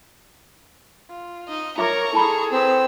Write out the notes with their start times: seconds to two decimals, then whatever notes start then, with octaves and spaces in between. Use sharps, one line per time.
1.10 F4
1.48 D#4 D#5
1.78 F4 A#4 C#5 E5 A#5 C#6 D6
2.13 E4 G#4 A4 A5 B5
2.52 C4 B4 E6